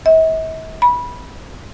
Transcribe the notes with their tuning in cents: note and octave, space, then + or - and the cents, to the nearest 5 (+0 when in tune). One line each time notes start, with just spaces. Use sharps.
E5 -45
B5 -15